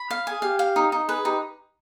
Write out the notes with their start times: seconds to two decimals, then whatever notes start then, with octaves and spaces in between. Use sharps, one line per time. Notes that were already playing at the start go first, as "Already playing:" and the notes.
Already playing: B5
0.11 F5
0.27 G#4 G#5
0.42 G4 F5
0.59 F5
0.76 D#4
0.92 D#4
1.08 G#4 B4
1.24 D#4 G4